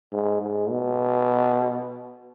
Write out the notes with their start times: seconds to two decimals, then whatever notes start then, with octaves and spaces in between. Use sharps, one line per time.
0.12 G#2
0.41 G#2
0.71 B2